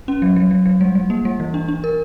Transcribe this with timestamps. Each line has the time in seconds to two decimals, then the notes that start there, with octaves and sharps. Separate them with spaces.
0.08 C#4
0.22 F#3
0.36 F#3
0.51 F#3
0.65 F#3
0.81 G3
0.95 G3
1.10 A#3
1.25 G3
1.40 E3
1.54 D4
1.68 D4
1.84 A#4